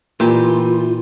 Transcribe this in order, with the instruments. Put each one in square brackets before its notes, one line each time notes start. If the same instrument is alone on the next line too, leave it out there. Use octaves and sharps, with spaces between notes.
[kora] A#2 G4 [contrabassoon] E3 [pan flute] F4